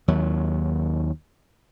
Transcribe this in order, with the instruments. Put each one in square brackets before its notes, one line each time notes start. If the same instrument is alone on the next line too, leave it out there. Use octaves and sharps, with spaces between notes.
[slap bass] D#2 F#3